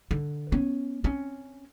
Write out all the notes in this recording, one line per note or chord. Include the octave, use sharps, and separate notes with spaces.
D3
B3 C#4
C4 C#4